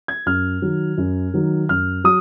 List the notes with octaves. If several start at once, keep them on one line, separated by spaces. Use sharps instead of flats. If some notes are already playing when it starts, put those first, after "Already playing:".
G#6
F#2 F6
D#3 F#3
F#2
D#3 F#3
F#2 F6
F#3 D#6